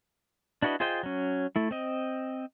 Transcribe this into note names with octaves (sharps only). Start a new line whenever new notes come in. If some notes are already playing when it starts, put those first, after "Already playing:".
D4 E4 F#4 B4 D#5
F4 G#4 C5 D#5 G5
F#3 C#4
A3 E4
C4 D#5